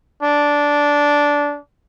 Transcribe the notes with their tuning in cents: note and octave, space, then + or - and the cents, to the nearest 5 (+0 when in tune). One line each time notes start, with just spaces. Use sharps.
D4 -10